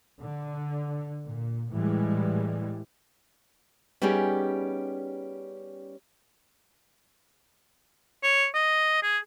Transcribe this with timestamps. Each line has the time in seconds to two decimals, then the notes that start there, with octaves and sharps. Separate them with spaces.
0.22 D3
1.25 A#2
1.71 A2 E3 G3 G#3
4.02 G3 B3 C#4 D#4 G4 G#4
8.23 C#5
8.54 D#5
9.02 G#4